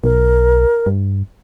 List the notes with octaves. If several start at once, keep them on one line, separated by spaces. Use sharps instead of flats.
B1 A#4
G2